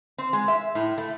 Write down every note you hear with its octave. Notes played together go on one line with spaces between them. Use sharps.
C4
G#3
E5
A2
A3